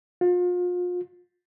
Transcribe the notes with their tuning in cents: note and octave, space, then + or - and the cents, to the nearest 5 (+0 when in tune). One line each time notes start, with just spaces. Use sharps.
F4 +35